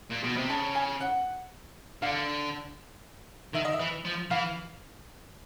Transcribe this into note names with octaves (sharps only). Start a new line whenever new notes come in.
A#2
B2
C3
C#3 A5
G#5
F#5
D3 F5
D#3 E5
D#5
E5
E3
F3
E3 F5